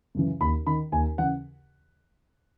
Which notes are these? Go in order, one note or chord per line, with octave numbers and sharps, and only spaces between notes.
F#2 C#3 E3
D#2 B5
D#3 B5
D#2 G#5
C#3 E3 F#5